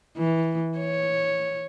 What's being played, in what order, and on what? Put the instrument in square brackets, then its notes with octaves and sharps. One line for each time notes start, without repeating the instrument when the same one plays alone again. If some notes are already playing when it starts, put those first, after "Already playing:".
[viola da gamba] E3
C#5